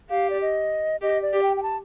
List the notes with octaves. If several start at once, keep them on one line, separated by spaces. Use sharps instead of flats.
G4 F5
D5
D#5
G4 D#5
D5
G4
G5
G5
A5